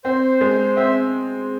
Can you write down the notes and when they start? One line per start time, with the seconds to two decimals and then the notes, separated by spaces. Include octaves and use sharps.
0.04 C4 C5
0.41 G#3
0.76 C4 E5